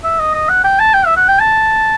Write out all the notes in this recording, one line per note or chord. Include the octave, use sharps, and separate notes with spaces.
E5
D#5
D#5
F#5
G5
A5
G5
E5
F#5
G5
A5